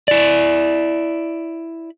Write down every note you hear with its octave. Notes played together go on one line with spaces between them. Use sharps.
E4 D5